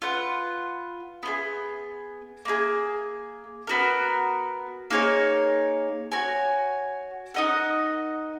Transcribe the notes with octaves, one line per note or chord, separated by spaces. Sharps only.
F4 B4 F#5
B3 F4 G#4
A#3 D#4 G#4
B3 F#4 A#4
A#3 D#4 G#4 C#5
F#4 C#5 G#5
D#4 A#4 D#5 F#5